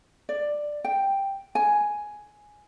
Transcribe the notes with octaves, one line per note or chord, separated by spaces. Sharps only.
D5
G5
G#5